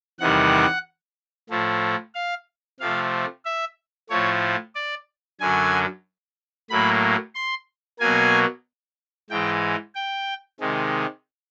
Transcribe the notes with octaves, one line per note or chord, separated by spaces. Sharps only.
E2 C3 D#3 G3 F#5
A2 F3 A3
F5
C3 F3 A3 F5
E5
A2 F3 A3 C#5
D5
F#2 D3 F#3 G#5
A2 F#3 A#3 B5
C6
B2 F#3 A#3 G#5
G#2 E3 G#3 G5
G5
C3 D#3 G#3